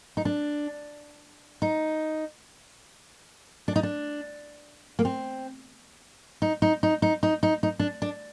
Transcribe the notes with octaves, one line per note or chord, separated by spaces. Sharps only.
D#4
D4
D#4
D4
D#4
D4
A#3
C4
D#4
D#4
D#4
D#4
D#4
D#4
D#4
D4
D4